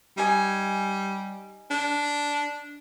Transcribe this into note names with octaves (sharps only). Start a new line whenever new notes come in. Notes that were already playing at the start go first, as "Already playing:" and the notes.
G3 D#4 G#5
D4